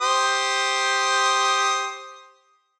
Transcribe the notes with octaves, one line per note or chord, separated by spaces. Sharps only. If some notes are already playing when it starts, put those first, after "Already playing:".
G4 C5 D#6